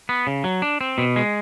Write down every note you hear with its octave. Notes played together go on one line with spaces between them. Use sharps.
B3
C#3
F#3
D4
C4
B2
G#3